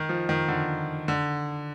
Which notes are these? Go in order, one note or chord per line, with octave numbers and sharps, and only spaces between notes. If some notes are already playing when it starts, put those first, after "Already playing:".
Already playing: D#3
F3
D#3
D3
D3